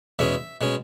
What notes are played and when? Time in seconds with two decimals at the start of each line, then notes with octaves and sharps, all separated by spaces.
0.19 E2 B2 G#3 C#4 E5
0.61 B2 G#3 C#4